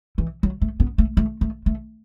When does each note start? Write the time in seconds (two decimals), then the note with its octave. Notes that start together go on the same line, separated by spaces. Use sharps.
0.18 E3
0.43 F#3
0.61 A3
0.80 B3
0.98 A3
1.17 A3
1.41 A3
1.66 A3